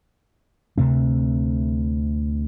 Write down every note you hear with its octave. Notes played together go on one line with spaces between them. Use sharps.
D2 C3 A3 C4